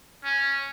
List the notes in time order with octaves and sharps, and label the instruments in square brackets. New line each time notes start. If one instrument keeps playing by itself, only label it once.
[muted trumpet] C#4